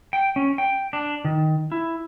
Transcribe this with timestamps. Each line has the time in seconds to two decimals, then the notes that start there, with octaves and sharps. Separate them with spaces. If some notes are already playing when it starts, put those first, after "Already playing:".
0.13 G5
0.36 C#4
0.58 G5
0.93 D4
1.25 D#3
1.72 E4